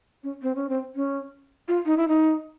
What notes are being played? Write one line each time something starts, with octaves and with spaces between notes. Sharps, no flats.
C#4
C4
C#4
C4
C#4
F4
D#4
E4
D#4